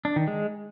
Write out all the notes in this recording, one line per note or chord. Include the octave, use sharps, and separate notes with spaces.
D4
D#3
G#3